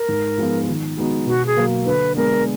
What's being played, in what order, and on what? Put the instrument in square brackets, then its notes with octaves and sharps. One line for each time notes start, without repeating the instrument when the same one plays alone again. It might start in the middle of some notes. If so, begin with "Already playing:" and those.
Already playing: [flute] A#4
[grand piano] G#2
F3 G#3 B3 F4
D#3
G#3 B3 D#4 F#4
[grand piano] B2 [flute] F#4
[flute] G#4
[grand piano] F#3 A#3
[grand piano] D3 [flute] B4
[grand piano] G#3 B3 D4 [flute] A#4